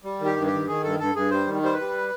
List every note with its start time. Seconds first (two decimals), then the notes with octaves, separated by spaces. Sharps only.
0.04 G3
0.20 D#3
0.25 G4
0.36 G2
0.47 G4
0.53 D#3
0.68 D#3 G#4
0.83 G2 A4
0.99 G2 A4
1.15 G2 G#4
1.31 G3 C5
1.47 D#3
1.62 G3 C5
1.73 B4
1.79 G3